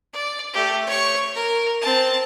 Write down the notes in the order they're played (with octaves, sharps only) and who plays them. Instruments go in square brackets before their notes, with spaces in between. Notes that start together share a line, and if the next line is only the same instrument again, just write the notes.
[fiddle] D5
A3 G4
C#5 C#6
A#4
C4 A5